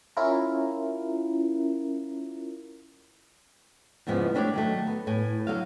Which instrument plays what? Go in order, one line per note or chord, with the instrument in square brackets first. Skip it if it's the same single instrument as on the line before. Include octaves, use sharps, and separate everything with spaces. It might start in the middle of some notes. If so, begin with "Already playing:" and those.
[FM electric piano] C#4 E4 F4 A#4
[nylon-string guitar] E2 G#2 C#3 F3 B3
G3 A3 D4 G#4 C#5 D5
D#3 F#3 A3
B3
A2 G#5
D3 F#3 F5